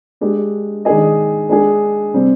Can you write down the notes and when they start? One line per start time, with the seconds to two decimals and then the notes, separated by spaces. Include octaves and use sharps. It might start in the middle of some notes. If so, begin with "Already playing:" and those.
0.21 G#3 D4 G4
0.85 D#3 G#3 D4 G#4 D#5
1.49 G#3 D4 G#4
2.14 C3 G3 C4